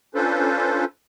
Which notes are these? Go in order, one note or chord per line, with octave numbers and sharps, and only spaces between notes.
C#4 D4 F4 A4 B4 C5